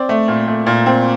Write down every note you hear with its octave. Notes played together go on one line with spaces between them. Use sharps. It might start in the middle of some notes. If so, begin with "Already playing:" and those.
Already playing: C4 D5
A3
A#2
A3
A#2
C4